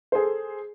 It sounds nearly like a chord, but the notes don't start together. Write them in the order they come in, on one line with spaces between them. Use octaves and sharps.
C5 G#4 A4